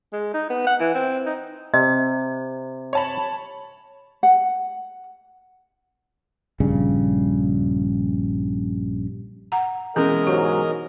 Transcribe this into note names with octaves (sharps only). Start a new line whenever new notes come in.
G#3
D#4
B3
F#5
E3
C4
D#4
C3 D#5
C#5 A5 B5
F#5
A#1 G2 C#3
F#5 A#5
B2 E3 G#3 C#4 A#4 D#5 A#5
G#2 F#3 G4